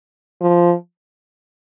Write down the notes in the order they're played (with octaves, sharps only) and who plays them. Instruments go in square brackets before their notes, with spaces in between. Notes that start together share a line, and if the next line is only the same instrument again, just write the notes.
[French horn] F3